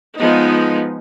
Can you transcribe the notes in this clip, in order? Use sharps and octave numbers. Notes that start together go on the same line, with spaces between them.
F3 G#3 B3 D#4